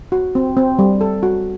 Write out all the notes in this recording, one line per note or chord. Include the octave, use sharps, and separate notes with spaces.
F#4
C4
C4
G3
A4
F#4